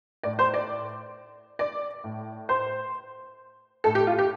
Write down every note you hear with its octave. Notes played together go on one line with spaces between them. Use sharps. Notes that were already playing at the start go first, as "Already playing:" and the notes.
A2 D5
C5
D5
D5
A2
C5
A2 A4
G4
F4
G4